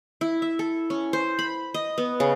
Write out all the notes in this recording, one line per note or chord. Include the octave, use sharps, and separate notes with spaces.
E4
E5
A4
C#4
C5
B5
D#5
B3
C#3